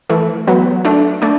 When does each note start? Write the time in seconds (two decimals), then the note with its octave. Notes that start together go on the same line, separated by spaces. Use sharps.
0.10 E3 A3
0.47 F#3 B3
0.85 A3 D4
1.22 A3 D4